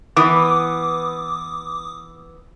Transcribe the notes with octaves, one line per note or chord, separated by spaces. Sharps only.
E3 B3 D6 D#6